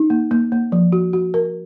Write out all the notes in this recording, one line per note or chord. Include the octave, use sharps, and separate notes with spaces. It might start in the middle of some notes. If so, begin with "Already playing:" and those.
Already playing: D#4
A#3
A#3
A#3
F3
F#4
F#4
A#4